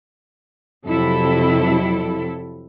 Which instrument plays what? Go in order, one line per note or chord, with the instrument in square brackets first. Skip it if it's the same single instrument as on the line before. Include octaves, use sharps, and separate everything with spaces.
[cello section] F2 C3 F#3 E4 A4